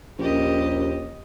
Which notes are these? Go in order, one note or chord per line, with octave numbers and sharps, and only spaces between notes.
A#1 D#2 C#4 G4 A#4 D#5